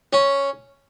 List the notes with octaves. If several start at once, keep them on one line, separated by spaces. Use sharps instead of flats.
C#4